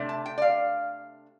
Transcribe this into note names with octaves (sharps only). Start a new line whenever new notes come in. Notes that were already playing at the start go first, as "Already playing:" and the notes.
Already playing: C3 A3 D4
A5
G5
D5
F5